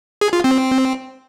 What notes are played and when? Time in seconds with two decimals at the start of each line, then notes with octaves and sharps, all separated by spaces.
0.21 G#4
0.33 F4
0.44 C4